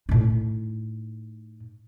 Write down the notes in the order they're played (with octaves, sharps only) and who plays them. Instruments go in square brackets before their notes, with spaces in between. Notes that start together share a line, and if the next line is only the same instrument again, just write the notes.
[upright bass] A2 D#4